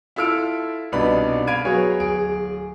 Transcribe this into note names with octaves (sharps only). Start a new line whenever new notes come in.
E4 F4 A4 E6 F6 D7
C2 B2 D4 D#4 B4 B5
F5 B5 G#6 D7 D#7
F#3 B3 G#4 C#5
D1 G#4 D7